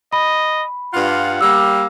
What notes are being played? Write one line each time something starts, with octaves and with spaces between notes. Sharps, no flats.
D#5 B5
G2 F4 F#5
G3 A#3 E6